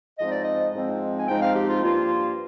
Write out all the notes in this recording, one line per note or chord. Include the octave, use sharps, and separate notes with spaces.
G#2 F3 G#3 C4 D#4 D#5
D5
D#5
G#2 F3 G#3 C4 D#4
G#5
G#2 F3 G#3 C4 D#4 G5
F5
G4
F4
G2 F3 A#3 F4